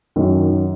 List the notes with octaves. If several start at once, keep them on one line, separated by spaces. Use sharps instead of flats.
F#2 D#3 F#3